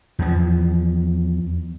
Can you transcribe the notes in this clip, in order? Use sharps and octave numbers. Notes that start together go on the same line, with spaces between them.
E2 F3